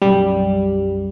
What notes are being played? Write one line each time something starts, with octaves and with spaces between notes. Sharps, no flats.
B1 F#2 G3